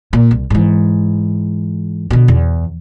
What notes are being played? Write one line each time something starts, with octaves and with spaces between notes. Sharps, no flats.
A#2
C2
G#2 E3
B2 D3
E2